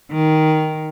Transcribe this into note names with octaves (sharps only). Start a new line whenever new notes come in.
D#3